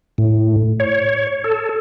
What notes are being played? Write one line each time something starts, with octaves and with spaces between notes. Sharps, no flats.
A2
C#5
A4